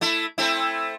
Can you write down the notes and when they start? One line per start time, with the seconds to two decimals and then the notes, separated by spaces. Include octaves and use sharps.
0.01 A3 E4
0.38 A3 C4 E4